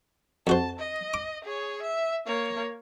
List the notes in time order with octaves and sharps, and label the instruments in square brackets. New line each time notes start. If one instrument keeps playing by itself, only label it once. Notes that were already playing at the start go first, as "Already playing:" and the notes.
[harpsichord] F2 F#4 C5 [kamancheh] A5
[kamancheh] D#5
[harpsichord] D6
[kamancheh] G#4 C#5
E5
A#3 C#5